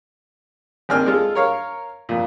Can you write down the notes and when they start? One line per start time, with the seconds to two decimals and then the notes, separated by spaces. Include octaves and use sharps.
0.89 G#1 A#3 C4 D4 G#5 F6
1.06 G#3 F4 A4
1.35 A#4 C#5 F5
2.09 F2 A#2